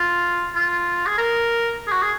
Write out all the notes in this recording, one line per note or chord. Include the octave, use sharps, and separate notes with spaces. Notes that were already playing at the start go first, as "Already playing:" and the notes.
Already playing: F4
F4
G#4
A#4
G#4
F#4
G#4